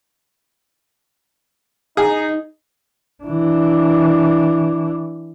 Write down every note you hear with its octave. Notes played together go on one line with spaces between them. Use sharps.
D#4 G#4
E3 D4